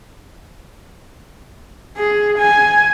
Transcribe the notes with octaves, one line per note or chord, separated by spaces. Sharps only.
G#4
G#5